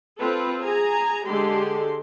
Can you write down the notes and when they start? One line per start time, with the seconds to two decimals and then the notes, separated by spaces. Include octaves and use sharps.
0.18 C4 F4 A4 B4
0.63 G#4 G#5 A#5
1.26 D3 G#3 G4 A4 C6